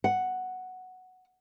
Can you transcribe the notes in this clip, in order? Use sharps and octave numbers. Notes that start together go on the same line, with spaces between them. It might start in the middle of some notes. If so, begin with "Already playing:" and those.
F#5